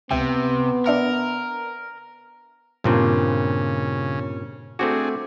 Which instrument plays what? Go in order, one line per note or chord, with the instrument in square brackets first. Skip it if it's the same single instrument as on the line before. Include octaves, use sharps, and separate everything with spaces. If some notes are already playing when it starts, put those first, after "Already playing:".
[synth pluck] C#2 E5 G5 [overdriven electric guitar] C3 [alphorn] B3
[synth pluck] D4 E5 C#7 [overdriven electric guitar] A#4
[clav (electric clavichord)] G2 A#2 C4 [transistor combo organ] C#3
[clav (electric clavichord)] A3 C4 F#4 [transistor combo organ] D4 G#4